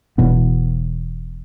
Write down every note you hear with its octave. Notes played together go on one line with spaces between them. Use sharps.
E1 E2 B2 B3